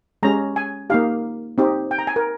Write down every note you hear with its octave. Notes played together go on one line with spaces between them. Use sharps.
G#3 C#4 G4 A#5
G#5
A#3 D#4 G4 F5
C4 D#4 G4
G5
A#5
G#5
A#4